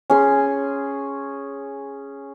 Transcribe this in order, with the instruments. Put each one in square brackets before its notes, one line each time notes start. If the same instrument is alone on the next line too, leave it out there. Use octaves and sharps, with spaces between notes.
[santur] C#4 G#4 C6